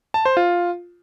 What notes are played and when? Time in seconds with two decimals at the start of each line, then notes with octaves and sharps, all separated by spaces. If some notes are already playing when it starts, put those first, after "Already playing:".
0.14 A5
0.25 C5
0.37 F4